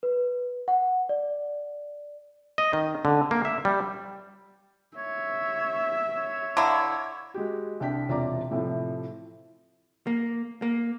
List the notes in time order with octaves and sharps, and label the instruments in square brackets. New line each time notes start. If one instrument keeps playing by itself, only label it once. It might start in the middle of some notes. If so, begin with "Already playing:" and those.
[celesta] B4
F#5
D5
[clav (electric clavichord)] D#5
D#3
D3
A#3
E5
G3
[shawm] C#5 [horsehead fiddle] E5
[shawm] C#5
[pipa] D3 E4 [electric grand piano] F5 A#5 D6
[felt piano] G#3 F#4 G4
C2 D4 G5 B6
E1 C3 F4 D5 A#5 D6
A2 C3 E3 F3 A3
[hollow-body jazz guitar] A#3
A#3